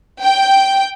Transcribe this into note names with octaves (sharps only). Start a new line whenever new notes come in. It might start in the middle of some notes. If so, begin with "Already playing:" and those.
G5